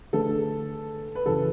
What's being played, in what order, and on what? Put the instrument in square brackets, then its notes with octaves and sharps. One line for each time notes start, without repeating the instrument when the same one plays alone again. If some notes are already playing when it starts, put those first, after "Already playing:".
[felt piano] D3 A3 D4 G#4 B4 [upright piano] A4
[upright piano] B4
[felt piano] F#2 C#3 E3 [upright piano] A4